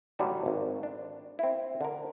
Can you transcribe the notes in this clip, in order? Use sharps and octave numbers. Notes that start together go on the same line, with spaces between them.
A1 D3 F#3 G3 D#4 F#4
G#1
D4
C4 E4
D3 A#4